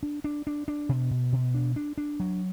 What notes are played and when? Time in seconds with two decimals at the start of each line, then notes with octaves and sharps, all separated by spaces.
0.03 D4
0.24 D4
0.47 D4
0.68 D4
0.89 B2
1.11 B2
1.32 B2
1.54 D4
1.76 D4
1.98 D4
2.20 F#3